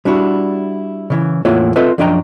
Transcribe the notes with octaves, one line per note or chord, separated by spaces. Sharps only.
G3 D4 E4 F#4
C#3 E3
E2 A2 A#3 F4 C#5 F#5
C4 F4 A4 B4 D#5 E5
F#2 F3 D4 D#5 G5 A#5